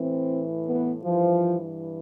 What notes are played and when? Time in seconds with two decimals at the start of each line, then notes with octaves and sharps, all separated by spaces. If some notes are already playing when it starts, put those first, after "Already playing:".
Already playing: A2 E3 C4
0.67 B3
1.03 G2 E3 F3